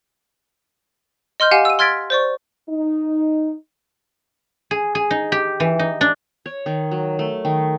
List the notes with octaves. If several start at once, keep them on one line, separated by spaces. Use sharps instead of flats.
D#5 C6 F6 G6
G4 F5 F#5 G#5
E6 D#7
C6 F6 G#6 A6 B6 D7
C5 D5 C#6
D#4
G#4
G#4
D#4
G4
E3
D#4
D4
C#5
D#3
F#3
A3
D#3